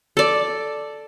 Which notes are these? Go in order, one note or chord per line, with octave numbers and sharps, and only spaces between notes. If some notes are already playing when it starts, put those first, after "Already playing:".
A4 D5